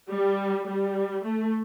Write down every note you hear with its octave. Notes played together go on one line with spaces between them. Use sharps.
G3
G3
A3